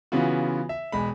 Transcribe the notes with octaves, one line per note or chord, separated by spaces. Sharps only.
C#3 E3 B3 F4 F#4
E5
E1 G#3 B5